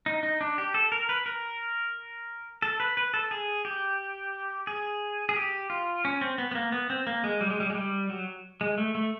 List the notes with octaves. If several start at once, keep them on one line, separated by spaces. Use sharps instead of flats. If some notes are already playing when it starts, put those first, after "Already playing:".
D#4
D#4
D4
G4
A4
A#4
B4
A#4
A4
B4
B4
A4
G#4
G4
G#4
G#4
G4
F4
C#4
C4
B3
B3
A#3
B3
C4
A#3
G#3
G3
G#3
G3
G#3
G3
F#3
G#3
A3
A3